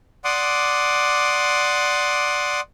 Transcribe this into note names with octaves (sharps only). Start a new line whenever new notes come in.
D5 F#5 C6 D6 D#6